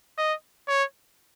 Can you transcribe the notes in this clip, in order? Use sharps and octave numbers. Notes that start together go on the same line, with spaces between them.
D#5
C#5